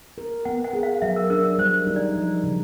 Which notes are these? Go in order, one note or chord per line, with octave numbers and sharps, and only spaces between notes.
A#4
B3 F#5
F#5
G#4
F5
F#3 E5
A#4
D4 A#4
G3 C5
D#4
D5
F3
C#3